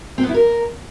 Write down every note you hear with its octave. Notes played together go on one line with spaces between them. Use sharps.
C4
B3
E4
A#4